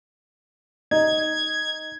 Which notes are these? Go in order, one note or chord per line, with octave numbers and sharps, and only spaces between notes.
D#4 G#6